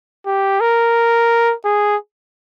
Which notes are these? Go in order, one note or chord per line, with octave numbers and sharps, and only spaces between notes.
G4
A#4
G#4